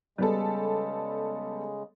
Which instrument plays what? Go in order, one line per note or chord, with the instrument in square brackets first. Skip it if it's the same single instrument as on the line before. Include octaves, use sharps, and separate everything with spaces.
[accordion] C#3 G#3 [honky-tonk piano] G3 B3 A4